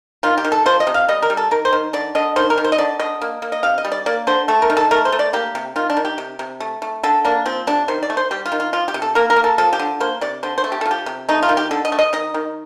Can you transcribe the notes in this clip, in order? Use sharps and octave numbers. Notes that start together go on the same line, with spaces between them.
D#3 F4
G4
D#3
A4
F3 C5
D#5
C3
F5
G3 D#5
A#4
G3
A4
D#3 A#4
C5
D#3
D3 D5
D3 D#5
D#3 C5
A#4
D#3
C5
D#5
D3 D5
D3 D#5
A#3
A#3
D#5
C3 F5
D#5
G3
D5
A#3 D5
D3 C5
A3 A4
A#4
D#3
A4
A3 A#4
C5
A3
D5
A#3 G4
C3
D#3 F4
D4
D#3
G4
C3
C3
A3
A3
D3 A4
A#3 D4
F3 C4
C3 D4
D#3 C5
D5
A3
C5
G3 G4
F4
D#3
F4
F3 F4
G4
C3
A4
A#3 A#4
A#4
A#3
A4
F3 A4
G4
D3
A#3 C5
C3 D5
D3 C5
C5
A3
G4
F3 A4
G4
C3
A3 D#4
F4
D#3
G4
D3 A4
D#5
A3
D#5
D#3 D#5
D#3